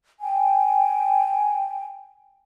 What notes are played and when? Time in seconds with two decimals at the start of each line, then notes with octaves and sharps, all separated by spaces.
0.20 G5 G#5